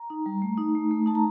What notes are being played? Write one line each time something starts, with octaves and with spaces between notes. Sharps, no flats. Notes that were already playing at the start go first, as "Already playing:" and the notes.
Already playing: A#5
D#4
G3
A3
D#4
A3
A3
D#4 A5
A#5